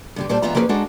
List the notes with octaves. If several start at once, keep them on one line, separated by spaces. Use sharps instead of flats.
G2 D3 G4
A#2 G3 C5 D5 A5
G#2 E3 B3 F4 E5 A#5
F3 A#3 B3 C#4 G#4 B4
G#3 D4 D#4 F#4 A4